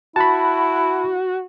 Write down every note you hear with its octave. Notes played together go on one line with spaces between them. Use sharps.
E4 F#4 A5 B5